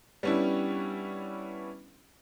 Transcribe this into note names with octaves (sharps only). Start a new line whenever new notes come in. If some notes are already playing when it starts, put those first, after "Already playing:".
G3 B3 C#4 D4 E4